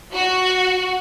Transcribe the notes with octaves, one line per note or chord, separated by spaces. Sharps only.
F#4